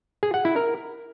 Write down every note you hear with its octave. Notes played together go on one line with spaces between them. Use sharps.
G#4
F#5
E4
A#4